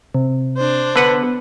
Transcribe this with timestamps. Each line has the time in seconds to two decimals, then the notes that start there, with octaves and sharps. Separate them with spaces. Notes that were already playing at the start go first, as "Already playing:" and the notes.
0.14 C3
0.57 D4 C5
0.96 D3 B3 B4 F#5